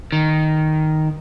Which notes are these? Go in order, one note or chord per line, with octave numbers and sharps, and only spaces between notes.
D#3